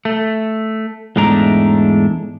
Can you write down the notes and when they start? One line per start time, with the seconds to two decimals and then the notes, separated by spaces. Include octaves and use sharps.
0.05 A3
1.16 E2 G#2 G#3 A3 D4 A#5